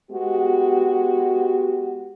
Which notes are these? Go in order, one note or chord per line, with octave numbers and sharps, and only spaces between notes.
G#3 B3 F#4 G4